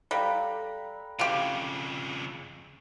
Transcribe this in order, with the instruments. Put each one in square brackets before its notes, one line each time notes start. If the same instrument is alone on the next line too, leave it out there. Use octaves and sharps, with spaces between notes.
[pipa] G3 [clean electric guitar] A4 F5 G5 [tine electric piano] A#5 B5 F#6
[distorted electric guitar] F2 C#3 [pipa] F4 G4